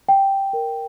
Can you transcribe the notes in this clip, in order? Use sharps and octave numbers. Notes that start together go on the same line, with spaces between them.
G5
A#4